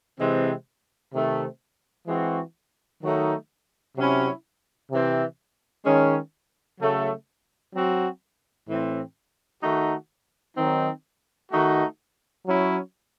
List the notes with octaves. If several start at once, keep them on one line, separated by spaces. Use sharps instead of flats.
C3 E3 G#3 C4
C3 D#3 A3 C4
E3 G#3 C4 F#4
D#3 F#3 A3 D#4 F#4
C3 F#3 C#4 E4
C3 E3 C4
D#3 G#3 C#4
C#3 F#3 A3
F#3 C4 F#4
A2 E3 C4
D#3 A3 D#4 F#4
D#3 F#3 C4 D#4
D#3 A3 D#4 F#4
F#3 C#4 E4